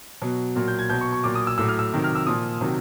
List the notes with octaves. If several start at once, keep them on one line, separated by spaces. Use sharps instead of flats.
B2 F#3
A#2 F#3
G6
G#6
B2 F#3 G6
C#6
C#6
A#2 F#3 D6
D#6
E6
A2 F#3 E6
F6
E6
C3 D#3 F#3
F6
E6
A#2 F3 D#6
C3 D#3 F#3